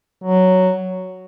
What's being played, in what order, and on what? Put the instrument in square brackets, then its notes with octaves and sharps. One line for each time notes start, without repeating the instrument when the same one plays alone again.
[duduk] F#3